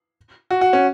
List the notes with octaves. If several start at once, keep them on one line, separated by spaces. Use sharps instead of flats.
F#4
F#4
C#4